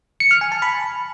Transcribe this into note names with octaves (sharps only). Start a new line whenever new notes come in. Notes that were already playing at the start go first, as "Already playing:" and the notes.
C#7
F6
G#5
A5
B5